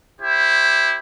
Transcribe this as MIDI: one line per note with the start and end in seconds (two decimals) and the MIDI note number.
0.21 0.98 64
0.21 0.98 67
0.21 0.98 72